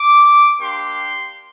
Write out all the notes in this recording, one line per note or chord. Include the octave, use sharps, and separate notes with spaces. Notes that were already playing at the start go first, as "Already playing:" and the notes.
Already playing: D6
A#3 D4 G4 C6